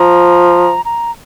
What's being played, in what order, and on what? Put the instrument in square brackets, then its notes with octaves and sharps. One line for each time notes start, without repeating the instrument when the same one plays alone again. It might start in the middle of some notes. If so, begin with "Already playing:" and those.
Already playing: [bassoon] F3 [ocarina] A#5
[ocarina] A#5